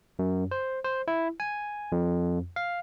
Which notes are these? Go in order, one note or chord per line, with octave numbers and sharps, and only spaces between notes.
F#2
C5
C5
E4
G#5
F2
F5